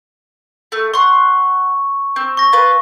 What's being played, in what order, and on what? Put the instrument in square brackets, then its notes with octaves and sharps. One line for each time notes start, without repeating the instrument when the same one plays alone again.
[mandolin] A3
[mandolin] F#5 C6 [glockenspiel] C#6
[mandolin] C4
[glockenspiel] C#6 A#6
[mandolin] F4 B4